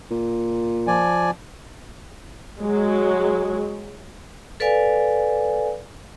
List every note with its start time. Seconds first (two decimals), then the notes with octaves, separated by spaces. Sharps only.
0.11 A#2
0.87 F3 D5 G#5
2.60 F#3 G#3
4.60 A4 B4 D5 F5 G#5